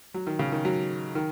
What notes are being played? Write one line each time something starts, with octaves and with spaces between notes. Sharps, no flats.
F#3
D#3
C#3
D#3
F#3
D#3